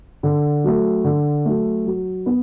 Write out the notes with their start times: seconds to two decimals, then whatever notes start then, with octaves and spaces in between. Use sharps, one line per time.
0.23 D3
0.64 F#3 A3
1.04 D3
1.45 F#3 A3
1.86 F#3
2.26 B3